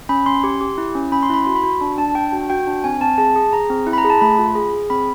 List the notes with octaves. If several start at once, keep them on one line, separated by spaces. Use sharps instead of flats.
C#4 B5
C#4 C6
G4
G4
E4
C#4
C#4 B5
C6
E4 B5
F#4 C6
B5
F#4
D4
D4 A5
D4 G5
F#4
F#4 G5
D4
C4 G#5
C4 A5
G#4 A5
G#4
G#4 A#5
C4
E4
B5
A#5
G#4
A5
A3 B5
F4
G#4
G#4
C4 B5